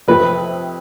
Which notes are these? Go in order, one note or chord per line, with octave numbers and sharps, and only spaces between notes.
F2 C3 F3 A3 B4